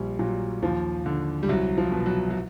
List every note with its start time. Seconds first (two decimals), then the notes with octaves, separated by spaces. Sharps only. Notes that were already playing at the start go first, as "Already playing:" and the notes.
Already playing: A#1 G3
0.19 A#2 F#3
0.62 D#2 F3
1.06 D3
1.43 G3
1.48 C2 F#3
1.78 F3
1.92 B2
2.06 F#3
2.30 F#3